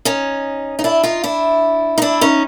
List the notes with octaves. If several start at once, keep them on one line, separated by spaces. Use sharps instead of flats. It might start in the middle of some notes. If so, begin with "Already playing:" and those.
C#4 D#4
D#4
D4 E4
D#4 F4
D4 E4
D#4
D4 E4
C#4 D#4